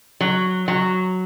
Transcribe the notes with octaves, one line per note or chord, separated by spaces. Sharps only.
F#3
F#3